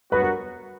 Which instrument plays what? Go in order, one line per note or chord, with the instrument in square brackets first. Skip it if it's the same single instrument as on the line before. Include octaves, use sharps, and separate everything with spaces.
[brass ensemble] G2 F#3 B3 F#4 [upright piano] B4
[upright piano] A#4